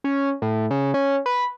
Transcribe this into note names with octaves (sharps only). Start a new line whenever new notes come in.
C#4
A2
C#3
C#4
B4